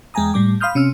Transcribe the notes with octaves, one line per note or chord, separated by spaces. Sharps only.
E2 G#3 G5 G#5 A#5 D#6
A2 G3 D6
F5 B5 C6 D#6 F6 G6
C3 C#4 E6 F6